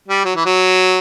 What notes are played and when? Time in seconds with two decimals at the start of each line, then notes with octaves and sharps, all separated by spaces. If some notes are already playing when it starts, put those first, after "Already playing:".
0.08 G3
0.25 F#3
0.35 E3
0.45 F#3